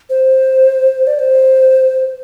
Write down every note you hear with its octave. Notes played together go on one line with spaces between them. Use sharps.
C5
D5
C5